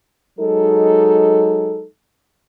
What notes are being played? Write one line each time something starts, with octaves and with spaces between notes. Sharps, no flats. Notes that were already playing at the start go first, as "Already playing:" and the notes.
F#3 G#3 D#4 A4